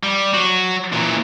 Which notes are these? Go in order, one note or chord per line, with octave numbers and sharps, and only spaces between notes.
G3
F#3 F#4
A#2 E3